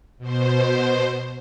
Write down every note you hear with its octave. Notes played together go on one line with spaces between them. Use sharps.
B2 C5